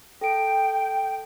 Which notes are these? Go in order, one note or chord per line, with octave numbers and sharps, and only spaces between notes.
A4 G5 D7